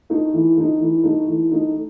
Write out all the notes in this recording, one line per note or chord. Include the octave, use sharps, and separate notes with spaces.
A3 D#4
E3
A3 D#4
E3
A3 D#4
E3
A3 D#4